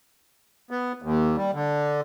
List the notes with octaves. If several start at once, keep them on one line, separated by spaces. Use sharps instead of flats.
B3
D#2
G3
D3